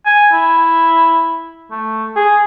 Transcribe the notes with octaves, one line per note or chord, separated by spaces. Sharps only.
G#5
E4
A3
G#4